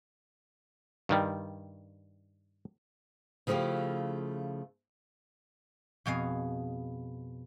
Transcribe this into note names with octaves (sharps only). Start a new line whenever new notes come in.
G2 D#3 G3
C#3 F3 A3 E4 F4 G4
F2 B2 G#4 F5